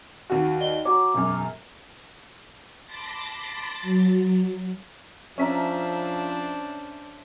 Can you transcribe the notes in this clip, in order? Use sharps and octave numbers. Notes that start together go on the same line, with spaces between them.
D#2 F#4
D5 D#5 G7
F#4 C#5 A#5 C#6 D6
E1 F#2
A5 B5 C6 D6 A6 A#6
F#3
F3 C#4 D4 C5 E5 A#5